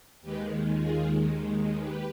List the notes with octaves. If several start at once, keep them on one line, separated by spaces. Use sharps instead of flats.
D#2 D#3 G#3 G4 B4
F4 G#4
G4 B4